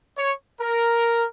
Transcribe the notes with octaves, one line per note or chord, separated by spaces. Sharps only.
C#5
A#4